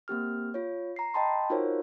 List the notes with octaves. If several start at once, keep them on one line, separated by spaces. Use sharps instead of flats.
A#3 C4 G4 F6
F4 C#5
A#5 C7
D#5 G5 A5 B5 C6
D#4 F4 F#4 A#4 C5 C#5